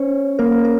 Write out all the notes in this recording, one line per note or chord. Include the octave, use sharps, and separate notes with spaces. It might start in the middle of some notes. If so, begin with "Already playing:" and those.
Already playing: C#4 C5 C#5
A#3 A#4
A#4